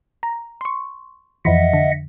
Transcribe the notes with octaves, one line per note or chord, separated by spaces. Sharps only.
A#5
C6 C#6
F2 E3 F3 D#5 E5 F#5
D3